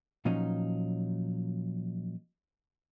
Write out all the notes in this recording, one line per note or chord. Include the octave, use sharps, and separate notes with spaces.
A#2 F3 F#3 C#4 D#4